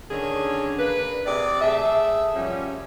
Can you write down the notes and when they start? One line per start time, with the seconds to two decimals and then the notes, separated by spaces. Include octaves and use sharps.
0.10 D3 D#3 C#4 D4 G#4
0.79 A#3 D4 B4
1.26 C3 G#4 D5
1.61 A3 G#4 E5
2.35 F#2 F3 G3 C#4